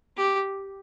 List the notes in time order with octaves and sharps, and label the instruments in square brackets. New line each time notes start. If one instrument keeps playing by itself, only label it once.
[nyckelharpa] G4